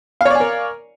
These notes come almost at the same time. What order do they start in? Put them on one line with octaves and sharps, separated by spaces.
F5 C#5 D5 G#5 A#4